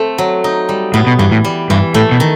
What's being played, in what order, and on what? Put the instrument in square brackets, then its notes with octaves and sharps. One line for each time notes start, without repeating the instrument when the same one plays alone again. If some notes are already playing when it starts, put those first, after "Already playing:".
Already playing: [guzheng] A3 C4
F#3
D#4
G3
[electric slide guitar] A2 [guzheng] B3
[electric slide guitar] B2
[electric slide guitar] G2 [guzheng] E3
[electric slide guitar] A2
[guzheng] G3
[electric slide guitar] G2 [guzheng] E3
[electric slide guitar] A2 [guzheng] A3
[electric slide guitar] B2
[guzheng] D#3